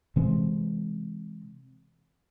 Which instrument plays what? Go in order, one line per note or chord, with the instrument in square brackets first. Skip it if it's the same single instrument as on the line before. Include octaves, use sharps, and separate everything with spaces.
[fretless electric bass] C3 E3 G#3 C4